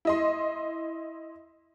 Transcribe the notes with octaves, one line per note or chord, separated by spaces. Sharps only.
E4 D#5 C6